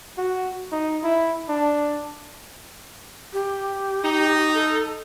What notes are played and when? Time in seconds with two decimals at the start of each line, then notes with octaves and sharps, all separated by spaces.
0.18 F#4
0.72 D#4
1.03 E4
1.49 D4
3.33 G4
4.04 D#4
4.54 A4